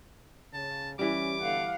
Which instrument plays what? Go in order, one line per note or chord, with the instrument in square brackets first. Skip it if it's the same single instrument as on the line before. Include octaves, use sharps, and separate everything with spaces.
[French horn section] C#3 [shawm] A5
[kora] E3 G3 [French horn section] C#4 [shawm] D6
[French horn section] B2 D3 [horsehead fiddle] F5 F#5